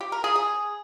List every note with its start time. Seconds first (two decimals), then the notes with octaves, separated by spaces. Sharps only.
0.01 G4
0.12 A#4
0.24 G#4
0.36 G#4